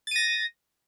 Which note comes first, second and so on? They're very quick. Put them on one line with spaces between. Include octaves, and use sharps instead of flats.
A6 D#7 A#6